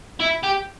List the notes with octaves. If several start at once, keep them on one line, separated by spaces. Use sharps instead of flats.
E4
G4